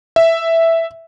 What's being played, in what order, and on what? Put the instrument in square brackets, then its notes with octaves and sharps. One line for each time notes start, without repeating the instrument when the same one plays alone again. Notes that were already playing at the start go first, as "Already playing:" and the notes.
[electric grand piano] E5